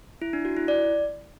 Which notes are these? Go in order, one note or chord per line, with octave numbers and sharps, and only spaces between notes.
E4
D4
F#4
E4
D5